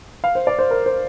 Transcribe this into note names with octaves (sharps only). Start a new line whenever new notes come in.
F5
C5
D5
C5
A#4
C5